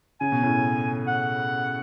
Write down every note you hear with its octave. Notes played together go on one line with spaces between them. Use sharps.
C#3 G#5
B2
A2 C#3
F#5